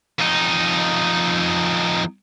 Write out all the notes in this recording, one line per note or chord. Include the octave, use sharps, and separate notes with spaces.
F2 D#4